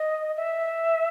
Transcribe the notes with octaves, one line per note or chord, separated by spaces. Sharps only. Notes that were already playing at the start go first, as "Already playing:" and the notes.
Already playing: D#5
E5